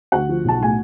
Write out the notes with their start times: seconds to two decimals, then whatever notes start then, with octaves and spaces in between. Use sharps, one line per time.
0.12 D2 F#4 F#5
0.29 F3
0.45 B1 A5
0.61 A2 G#5